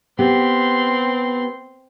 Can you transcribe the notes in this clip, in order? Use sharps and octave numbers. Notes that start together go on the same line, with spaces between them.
B3 C4 G4 C6